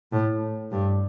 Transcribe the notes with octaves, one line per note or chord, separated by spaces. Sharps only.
A2
G2